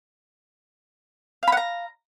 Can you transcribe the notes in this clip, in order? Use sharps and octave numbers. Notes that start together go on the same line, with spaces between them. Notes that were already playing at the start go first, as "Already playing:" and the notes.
F5 F#5 A#5 B5